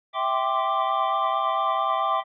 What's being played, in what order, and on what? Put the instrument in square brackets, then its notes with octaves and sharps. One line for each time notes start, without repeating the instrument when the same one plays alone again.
[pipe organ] E5 G5 C6 D6